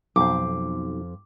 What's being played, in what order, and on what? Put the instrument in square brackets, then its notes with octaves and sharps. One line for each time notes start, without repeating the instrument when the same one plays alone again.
[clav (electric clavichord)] B1 [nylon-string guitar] F2 C5 [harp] D6